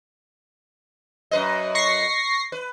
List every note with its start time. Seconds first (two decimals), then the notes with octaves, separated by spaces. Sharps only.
1.31 F#2 B4 D#5
1.75 C#6 A#6 C7
2.52 B4